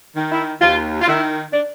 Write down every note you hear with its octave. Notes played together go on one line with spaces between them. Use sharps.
D#3
E4
D#2 F4
F4
D#3 E4
D4